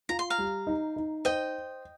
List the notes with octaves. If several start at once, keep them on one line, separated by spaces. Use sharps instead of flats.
F4 A#5
C6
F5 A#5
G3
D#4
D#4
C5 D#5 G5